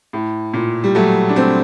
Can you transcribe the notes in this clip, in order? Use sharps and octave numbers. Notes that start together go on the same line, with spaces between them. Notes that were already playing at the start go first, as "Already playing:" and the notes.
A2
A#2
G3
F#3 A3
D4
A3 C4